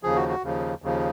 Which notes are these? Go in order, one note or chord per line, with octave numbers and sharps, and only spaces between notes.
D#2 C#3 F3 G#4
F#4
F#4
D#2 C#3 F3
D#2 C#3 F3